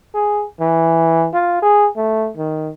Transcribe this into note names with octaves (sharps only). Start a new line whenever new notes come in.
G#4
E3
F4
G#4
A3
D#3